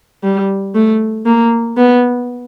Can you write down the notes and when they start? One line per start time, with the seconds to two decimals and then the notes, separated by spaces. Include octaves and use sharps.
0.24 G3
0.75 A3
1.26 A#3
1.77 B3